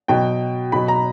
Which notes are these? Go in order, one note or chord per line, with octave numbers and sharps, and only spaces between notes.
B2 F#3 G5
B2 F#3 B5
A#5